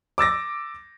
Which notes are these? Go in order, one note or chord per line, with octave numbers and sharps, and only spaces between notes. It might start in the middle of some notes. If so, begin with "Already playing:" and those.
D6 E6 A6 A#6